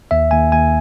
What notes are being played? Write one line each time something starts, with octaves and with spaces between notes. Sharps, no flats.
D#2 E5
D#2 G#5
D#2 G#5